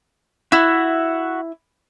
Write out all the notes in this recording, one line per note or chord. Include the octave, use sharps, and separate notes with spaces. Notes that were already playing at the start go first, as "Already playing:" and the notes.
E4 F#4 E5 F#5